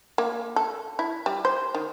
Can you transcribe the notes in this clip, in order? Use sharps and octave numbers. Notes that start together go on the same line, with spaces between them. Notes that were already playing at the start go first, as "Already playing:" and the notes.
A#3
A4
E4
G3
C5
D#3